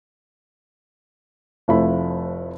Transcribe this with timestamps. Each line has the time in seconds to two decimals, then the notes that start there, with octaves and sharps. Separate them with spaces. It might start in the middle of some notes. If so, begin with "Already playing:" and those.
1.68 F1 F3 A3 E4 B5